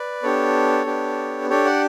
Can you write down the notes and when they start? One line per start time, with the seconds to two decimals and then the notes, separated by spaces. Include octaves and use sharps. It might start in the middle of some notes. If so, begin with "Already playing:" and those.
Already playing: B4 D5
0.23 B3 D4 G4 A4 C#5
0.86 B3 D4 G4
1.49 D4 G4 A4 C#5
1.65 D5 F#5